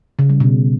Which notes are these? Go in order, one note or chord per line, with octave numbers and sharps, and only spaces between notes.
C#3
G3
B2